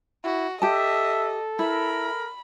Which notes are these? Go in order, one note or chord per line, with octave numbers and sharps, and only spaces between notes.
E4 F#4
G4 A4 D#5 E5 A5
E4 A#4 B5